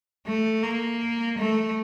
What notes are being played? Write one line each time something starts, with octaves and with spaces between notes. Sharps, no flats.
A3
A#3
A3